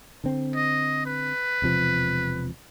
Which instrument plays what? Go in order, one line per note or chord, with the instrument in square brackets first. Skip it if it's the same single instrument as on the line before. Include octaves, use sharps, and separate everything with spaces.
[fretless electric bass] D3 C4
[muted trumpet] D#5
B4
[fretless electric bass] E1 C3 F3